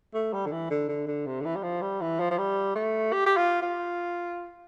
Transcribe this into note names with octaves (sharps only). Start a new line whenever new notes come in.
A3
G3
D3
E3
D3
D3
D3
C3
D3
E3
G3
F3
G3
E3
F3
F3
G3
A3
G4
G4
F4
F4